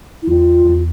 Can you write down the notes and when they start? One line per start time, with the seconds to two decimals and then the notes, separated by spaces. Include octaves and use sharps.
0.22 E4
0.27 E2 F4
0.65 E2